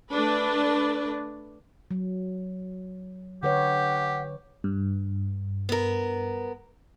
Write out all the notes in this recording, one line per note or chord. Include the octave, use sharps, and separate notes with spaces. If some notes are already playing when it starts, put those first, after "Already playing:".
A3 D4 B4
F#3
D3 G4 B4 C#5 F#5
G2
B3 A#4